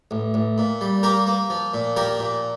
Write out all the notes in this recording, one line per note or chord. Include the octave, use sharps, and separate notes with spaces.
A1
A1
A#2
G3
A#3 G4 A#4
A#3
F3
A#2
F3 G4 A#4
A#2